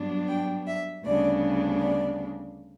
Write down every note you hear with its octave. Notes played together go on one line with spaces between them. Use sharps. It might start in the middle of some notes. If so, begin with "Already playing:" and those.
Already playing: G2 F#3 B3 D4
G5
E5
D2 C#3 G3 B3 D4 D5
D5